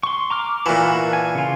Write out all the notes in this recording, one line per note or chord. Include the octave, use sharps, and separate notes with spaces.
C6 C#6
A#5 D6 F6
A#2 E3 F#4 A5 B5
G#5
C#3 F4